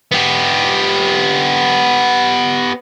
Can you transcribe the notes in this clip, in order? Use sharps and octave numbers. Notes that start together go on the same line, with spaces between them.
B3 G4